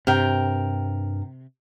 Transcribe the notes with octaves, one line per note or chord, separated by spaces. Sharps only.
G2 C3 A#4 G5